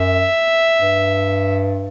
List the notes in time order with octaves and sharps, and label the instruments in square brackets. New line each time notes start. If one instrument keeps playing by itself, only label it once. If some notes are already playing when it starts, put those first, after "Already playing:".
Already playing: [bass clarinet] F#2 [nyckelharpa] E5
[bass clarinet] G2